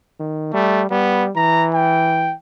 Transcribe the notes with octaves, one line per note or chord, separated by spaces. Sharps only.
D#3
G3 A3
G3 B3
E3 A#5
G5